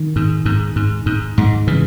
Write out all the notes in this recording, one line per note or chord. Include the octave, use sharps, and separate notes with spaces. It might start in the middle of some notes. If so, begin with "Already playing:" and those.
Already playing: D#3
G#2
G#2
G#2
G#2
G#2
C#3 E3